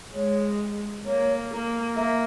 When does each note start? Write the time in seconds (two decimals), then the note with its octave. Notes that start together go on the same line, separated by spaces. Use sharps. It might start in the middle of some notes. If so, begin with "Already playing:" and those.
0.13 G#3 C#5
1.05 A#3 C#5
1.51 A#3
1.96 A#3 E5